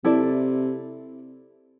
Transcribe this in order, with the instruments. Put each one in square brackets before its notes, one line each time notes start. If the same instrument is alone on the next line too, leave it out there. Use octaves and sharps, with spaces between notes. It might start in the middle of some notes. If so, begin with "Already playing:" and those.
[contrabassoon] C3 [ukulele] E4 A4 D5